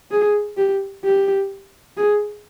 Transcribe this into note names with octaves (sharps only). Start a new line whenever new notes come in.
G#4
G4
G4
G#4